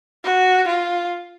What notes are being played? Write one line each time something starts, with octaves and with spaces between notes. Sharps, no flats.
F#4
F4